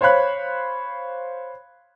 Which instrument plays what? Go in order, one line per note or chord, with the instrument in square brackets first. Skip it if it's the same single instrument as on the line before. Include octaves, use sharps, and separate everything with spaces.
[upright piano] C5 C#5 F5 B5 F#6